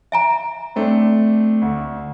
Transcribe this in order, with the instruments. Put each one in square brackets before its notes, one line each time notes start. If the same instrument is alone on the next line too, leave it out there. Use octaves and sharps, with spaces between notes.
[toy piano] E5 G#5 A#5
[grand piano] A3 C4 D4
D2